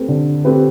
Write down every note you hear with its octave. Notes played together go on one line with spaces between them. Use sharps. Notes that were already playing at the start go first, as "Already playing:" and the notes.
Already playing: A3 C4 G4 B4
D3
A3 C4 G4 B4